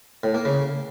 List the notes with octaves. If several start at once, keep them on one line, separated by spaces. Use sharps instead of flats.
A2
A#3
C#3